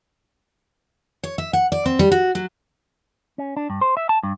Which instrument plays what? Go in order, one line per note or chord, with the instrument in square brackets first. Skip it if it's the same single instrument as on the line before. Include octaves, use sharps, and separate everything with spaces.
[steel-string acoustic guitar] C#5
E5
F#5
D5
C4
G3
F#4
F#3
[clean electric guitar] C#4
D4
G2
C5
E5
A5
G2